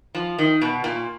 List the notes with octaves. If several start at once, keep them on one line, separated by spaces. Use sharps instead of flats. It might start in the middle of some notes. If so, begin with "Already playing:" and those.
F3
D#3
B2
A#2